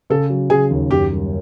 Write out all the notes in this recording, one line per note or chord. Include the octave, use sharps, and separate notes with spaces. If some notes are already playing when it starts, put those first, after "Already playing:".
C#3 A4
F#3
C#3 G#4
D#2
F#2 G4
G3